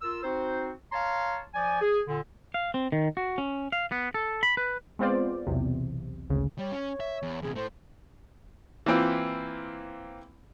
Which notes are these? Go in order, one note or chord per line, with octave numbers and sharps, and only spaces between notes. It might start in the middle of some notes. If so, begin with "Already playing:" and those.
F4 A#4 E6
C4 D#4 F#4 C5
C#5 F5 A5 A#5 C6
F3 D5 G#5
G#4
A#2 D3
F5
C4
D#3
F#4
C#4
F5
B3
A4
B5
B4
G#3 B3 C4 F4 C5 D5
B1 E2 C3
G#1 D2 C#3
G3 C#5
C#4
E5
E2
E2 C3 G#4
A2 A3 C5
E3 A#3 C4 E4 F4